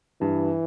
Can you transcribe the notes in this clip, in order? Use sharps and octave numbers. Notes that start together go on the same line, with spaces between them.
G2 E3